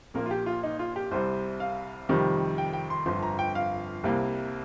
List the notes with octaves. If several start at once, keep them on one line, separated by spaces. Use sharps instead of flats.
A#1 A#2 A#3 A#4
F4
G4
F4
D#4
F4
G4
C2 C3 G3 C5
F5
F2 C3 D#3 G3
G5
G5
C6
G1 F2 F3 C6
A#5
G5
F5
C2 C3 G3 A#3